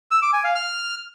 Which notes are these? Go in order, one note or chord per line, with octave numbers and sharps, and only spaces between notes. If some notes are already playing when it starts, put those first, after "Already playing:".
E6
D6
G#5
F5
F6